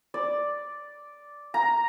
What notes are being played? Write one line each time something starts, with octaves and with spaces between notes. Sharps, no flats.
D5
A#5